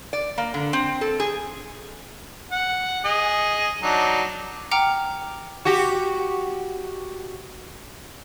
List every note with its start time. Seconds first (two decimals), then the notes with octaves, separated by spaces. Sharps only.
0.13 D5
0.38 A#3
0.54 D3
0.73 C4
1.01 A4
1.20 G#4
2.52 F#5
3.05 G#4 D#5
3.82 F#3 D4 D#4
4.71 F#5 G5 A#5 D6 F6
5.65 F#4 G4